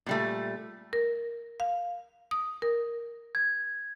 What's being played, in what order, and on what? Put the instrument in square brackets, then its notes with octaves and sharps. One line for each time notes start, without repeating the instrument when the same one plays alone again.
[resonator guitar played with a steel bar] A#2 G3 A3
[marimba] A#4
F5
D#6
A#4
[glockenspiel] G#6